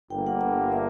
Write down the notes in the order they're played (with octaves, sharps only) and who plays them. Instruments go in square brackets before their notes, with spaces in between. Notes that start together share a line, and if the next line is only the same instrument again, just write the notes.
[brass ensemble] G1 G2 D3 A#3 [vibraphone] G5
[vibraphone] F#5
F#5
E5